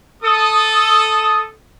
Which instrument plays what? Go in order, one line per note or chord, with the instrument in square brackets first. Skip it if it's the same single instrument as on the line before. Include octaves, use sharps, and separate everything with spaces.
[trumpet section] A4 D#6